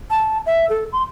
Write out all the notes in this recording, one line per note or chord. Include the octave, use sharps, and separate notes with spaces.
A5
E5
A4
C6